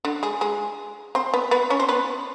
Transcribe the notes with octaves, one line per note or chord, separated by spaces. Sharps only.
D3 D4
G#3 G#4
G#3 G#4
C4 C5
B3 B4
B3 B4
C#4 C#5
C4 C5
B3 B4